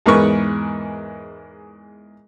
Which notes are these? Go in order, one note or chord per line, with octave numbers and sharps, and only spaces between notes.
E2 G#2 A#4 B4 C#6